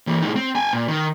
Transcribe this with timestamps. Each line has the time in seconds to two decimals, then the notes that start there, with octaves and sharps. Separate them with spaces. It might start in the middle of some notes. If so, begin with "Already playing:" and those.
0.07 E3 A#3
0.21 A2 D#4
0.36 C4
0.55 G5 G#5
0.73 A#2
0.88 D#3